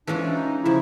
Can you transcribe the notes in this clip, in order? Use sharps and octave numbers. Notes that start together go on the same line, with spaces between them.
E3 G#3 C#4 D4 F4
D4
D#4
C#3 F3 E4